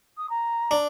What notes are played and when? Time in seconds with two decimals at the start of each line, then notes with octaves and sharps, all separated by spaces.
0.17 D#6
0.29 A#5
0.71 D4